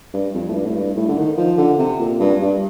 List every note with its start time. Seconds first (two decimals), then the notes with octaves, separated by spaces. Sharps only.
0.13 G2
0.34 F2
0.48 A2
0.54 G2
0.66 A2
0.75 G2
0.96 A2
1.08 D3
1.17 D#3
1.37 F3
1.58 D3
1.78 C3
1.99 A#2
2.19 G2
2.41 G2